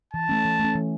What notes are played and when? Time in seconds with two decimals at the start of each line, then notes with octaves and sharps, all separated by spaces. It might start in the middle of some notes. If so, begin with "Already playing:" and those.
0.13 E3 A5
0.29 A3 C#4
0.45 E3
0.59 A3 C#4
0.75 E3